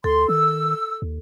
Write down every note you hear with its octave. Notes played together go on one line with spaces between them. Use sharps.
D2 A4 C6
D#3 E6
D#2